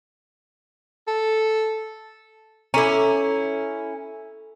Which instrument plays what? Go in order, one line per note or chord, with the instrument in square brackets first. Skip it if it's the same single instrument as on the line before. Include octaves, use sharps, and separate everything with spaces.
[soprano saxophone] A4
[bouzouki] C#4 E4 [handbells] A4 A#5